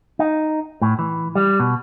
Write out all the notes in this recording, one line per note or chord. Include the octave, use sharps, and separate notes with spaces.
D#4
A2
E3
G3
B2